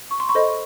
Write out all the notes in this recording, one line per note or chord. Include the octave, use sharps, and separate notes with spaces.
C#6
C6
B5 C#6
A4 C5 D#5